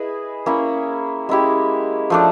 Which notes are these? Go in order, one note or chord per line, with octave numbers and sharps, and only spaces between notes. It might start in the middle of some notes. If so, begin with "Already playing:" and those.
Already playing: E4 G#4 B4 D#5
A#3 C#4 E4
G#3 C#4 E4 G4
F3 A3 D4